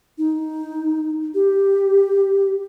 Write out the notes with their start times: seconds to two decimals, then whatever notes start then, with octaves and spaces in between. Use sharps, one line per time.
0.18 D#4
1.35 G4